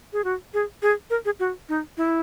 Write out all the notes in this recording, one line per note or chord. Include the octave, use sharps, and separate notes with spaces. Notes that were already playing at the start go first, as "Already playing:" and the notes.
G#4
F#4
G#4
G#4
A#4
G#4
F#4
D#4
E4